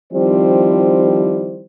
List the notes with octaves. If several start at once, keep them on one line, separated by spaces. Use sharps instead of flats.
D#3 F3 G3 C4 E4 C5